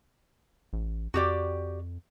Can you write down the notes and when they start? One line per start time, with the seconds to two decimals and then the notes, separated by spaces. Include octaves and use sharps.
0.73 A1
1.14 F2 F#4 G4 D5